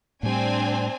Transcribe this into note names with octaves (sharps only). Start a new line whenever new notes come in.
A2 G3 C4 D4 G#5